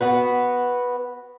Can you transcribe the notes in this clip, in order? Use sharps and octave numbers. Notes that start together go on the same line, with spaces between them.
B3 F#4 B4